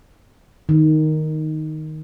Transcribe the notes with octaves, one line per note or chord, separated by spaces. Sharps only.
D#3